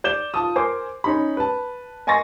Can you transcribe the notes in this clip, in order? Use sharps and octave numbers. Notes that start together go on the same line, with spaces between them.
D5 G6 E7 G7
F4 A5 D#6
A#4 C5 G#5 C6 D6
C#4 D#4 B5
B4 A5
D#5 G#5 C6 C#6 A6 A#6